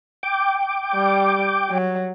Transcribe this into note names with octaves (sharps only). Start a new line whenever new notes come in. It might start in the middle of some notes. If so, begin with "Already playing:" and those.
G5 D6
G3
F#3